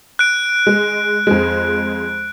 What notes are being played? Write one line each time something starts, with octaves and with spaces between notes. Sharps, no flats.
F#6 D7
G#3
F2 G#3